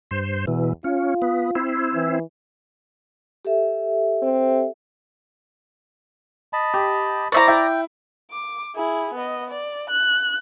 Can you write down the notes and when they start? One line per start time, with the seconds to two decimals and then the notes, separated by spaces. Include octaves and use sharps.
0.11 G2 C5
0.47 E2 B2 E3
0.84 C#4 F4
1.22 B3
1.55 C4 E4
1.95 E3
3.45 G4 A4 E5
4.22 C4
6.53 D#5 A5 B5
6.74 G4
7.32 E4 C5 D5 E5 A#5 C#6
7.48 E4 G5
8.31 D6
8.75 E4 G#4
9.14 B3 D#5
9.50 D5
9.90 F#6